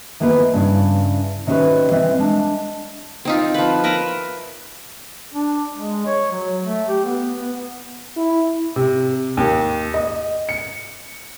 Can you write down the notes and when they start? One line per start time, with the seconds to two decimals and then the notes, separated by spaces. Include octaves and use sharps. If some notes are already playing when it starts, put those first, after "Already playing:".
0.20 D#3 E3 A#3 B3 F4 B4
0.53 G2 C#3 E4
1.47 C3 D#3 C#4 D#4 F#4 B4
1.91 E3 C4 D#5 E5
2.19 G#3 D4
3.25 C4 D#4 F4
3.54 F3 B4
3.84 A#4 B4 E5 A#5
5.34 D4
5.75 G#3
6.06 C#5
6.31 F#3
6.63 A3
6.88 G4
7.05 B3
7.41 B3
8.17 E4
8.76 C3
9.37 D#2
9.94 D#5
10.49 C#7